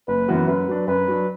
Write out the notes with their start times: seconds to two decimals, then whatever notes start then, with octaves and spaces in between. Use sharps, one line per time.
0.08 F#1 B4
0.28 F#2 E3 B3 F#4
0.48 F#2 B4
0.68 F#3 D4
0.87 F#2 B4
1.08 F#3 D4